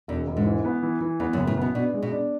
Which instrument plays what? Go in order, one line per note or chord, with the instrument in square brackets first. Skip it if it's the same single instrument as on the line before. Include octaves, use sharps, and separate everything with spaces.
[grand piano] E1 [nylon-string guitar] E2
[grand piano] E1
[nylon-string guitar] G#2
[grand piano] E3
B3
E3
E3
[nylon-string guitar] E2 [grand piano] B3
[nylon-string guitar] F#2
[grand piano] F#1
[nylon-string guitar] A2
[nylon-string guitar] B2 [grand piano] B3
[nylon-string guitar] B2 [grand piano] D4
[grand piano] G#3
[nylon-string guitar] B2
[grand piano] D4